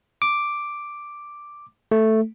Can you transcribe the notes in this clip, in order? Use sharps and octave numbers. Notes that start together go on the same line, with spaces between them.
D6
A3